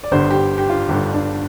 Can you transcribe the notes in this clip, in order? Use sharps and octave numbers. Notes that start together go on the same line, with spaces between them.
D5
G1 G2 D3 C5
G4
G4
F4
G1 G2 D3 G4
D4